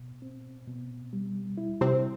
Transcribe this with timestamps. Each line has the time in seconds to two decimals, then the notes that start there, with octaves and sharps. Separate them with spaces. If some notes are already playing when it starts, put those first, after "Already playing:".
Already playing: B2
0.22 C4
0.68 B2
1.13 G3
1.58 E4
1.81 C3 C4